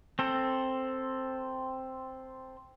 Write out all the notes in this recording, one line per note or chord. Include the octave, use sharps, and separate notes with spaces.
C4 A4